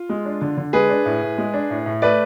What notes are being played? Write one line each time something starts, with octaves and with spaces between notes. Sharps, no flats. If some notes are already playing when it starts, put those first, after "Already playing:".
Already playing: F4
G#3
D4
D3
D3
G#3 G#4 B4
D4
A2
A2
G#3
D4
A2
A2
A3 B4 D5